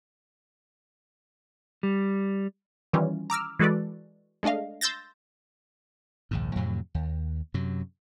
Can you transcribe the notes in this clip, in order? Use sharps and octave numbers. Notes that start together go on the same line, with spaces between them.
G3
D#3 E3 G3 C#4 F4
A#5 D6 E6 F6
E3 G#3 F#4 A4 B4 D5
G#3 A3 D4 D#5 F5
C6 E6 G6 A6 A#6
A#1 D#2 G#2
F2 A2 C3 F#3
D#2
F#2 C3 F#3